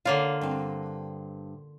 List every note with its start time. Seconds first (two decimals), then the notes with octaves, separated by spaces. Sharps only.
0.05 D3 A#3 F4 C#5 F5
0.41 G2 C4